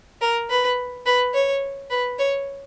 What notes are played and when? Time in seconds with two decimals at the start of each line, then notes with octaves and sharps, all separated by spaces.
0.22 A#4
0.50 B4
1.06 B4
1.34 C#5
1.90 B4
2.19 C#5